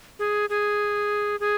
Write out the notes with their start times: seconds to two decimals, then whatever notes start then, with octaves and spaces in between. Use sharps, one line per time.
0.19 G#4
0.50 G#4
1.40 G#4